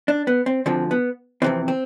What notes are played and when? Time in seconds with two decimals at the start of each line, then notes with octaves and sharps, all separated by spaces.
0.08 D4
0.27 B3
0.46 C4
0.66 D2 D3 F3 C4
0.91 B3
1.42 F2 C3 E3 C4
1.68 C4